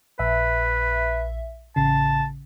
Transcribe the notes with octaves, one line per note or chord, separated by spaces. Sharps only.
A#1 B4 E5
A1 C#3 A5